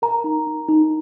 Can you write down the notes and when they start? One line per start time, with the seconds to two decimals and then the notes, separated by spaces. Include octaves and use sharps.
0.02 A#4 A#5
0.24 D#4
0.47 D#4
0.69 D#4